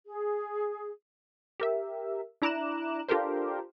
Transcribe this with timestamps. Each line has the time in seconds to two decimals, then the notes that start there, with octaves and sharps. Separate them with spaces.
0.06 G#4
1.60 G4 A#4 E5
2.42 D4 E4 A#5 D6 F#6 E7
3.08 D4 F4 G4 A4 A#4 C5